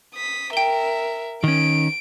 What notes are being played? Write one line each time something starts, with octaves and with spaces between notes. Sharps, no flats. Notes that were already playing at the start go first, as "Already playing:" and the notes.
D#6 B6
A#4 E5 G5 G7
D#3 C#4 D7